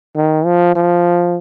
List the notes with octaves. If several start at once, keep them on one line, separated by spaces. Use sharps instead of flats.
D#3
F3
F3